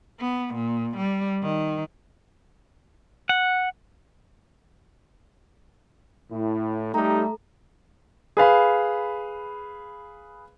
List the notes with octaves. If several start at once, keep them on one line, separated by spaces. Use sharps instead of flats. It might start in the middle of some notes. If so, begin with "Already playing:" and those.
B3
A#2
G3
D#3
F#5
A2 E4
G3 A3 D#4 G4 A4 A#5
G#4 B4 F5 B5